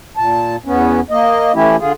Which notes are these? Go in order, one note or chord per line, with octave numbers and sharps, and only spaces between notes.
A#2 A5
E2 B3 C#4
A#3 D#5
E3 A3 C#4 E4 G4
D3 F4 G#4